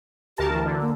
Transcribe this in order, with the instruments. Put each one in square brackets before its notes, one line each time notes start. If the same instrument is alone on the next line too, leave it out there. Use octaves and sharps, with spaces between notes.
[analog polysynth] D2 A#4 A5 [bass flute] G4
[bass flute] E3
[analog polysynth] D3
[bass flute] A#3